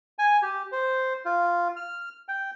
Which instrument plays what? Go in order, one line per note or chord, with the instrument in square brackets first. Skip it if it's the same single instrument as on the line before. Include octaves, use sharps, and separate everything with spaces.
[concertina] G#5
G4
C5
F4
F6
G5